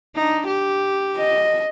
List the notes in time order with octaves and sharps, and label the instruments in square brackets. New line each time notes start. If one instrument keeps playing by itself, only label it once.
[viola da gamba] D4 D#4
G4
[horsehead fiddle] D#5